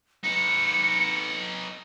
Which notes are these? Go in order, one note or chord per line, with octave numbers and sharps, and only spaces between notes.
D#4 B4 C#7